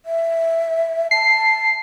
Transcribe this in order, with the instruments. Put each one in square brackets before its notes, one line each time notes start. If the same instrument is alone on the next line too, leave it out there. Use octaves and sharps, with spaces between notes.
[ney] E5
[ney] A5 [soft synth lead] C7